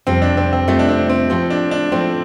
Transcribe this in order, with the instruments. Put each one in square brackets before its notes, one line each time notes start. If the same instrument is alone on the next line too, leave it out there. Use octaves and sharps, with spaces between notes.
[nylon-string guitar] F2 C3 G3 F4 [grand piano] C4
[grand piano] D4
C4
C4
[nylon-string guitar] F2 C3 G3 F4 [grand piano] A3
[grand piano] D4
C4
C4
[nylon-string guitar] A2 F3 A3 F4 [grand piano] C4
[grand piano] D4
D4
[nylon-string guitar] A2 F3 A3 F4 [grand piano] C4